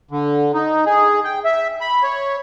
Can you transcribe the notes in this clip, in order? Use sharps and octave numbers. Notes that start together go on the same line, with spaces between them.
D3
D#4
G#4
G5
E5
B5
C#5